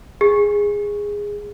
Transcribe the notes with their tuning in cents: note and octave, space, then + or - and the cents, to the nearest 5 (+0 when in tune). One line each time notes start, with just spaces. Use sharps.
G#4 -15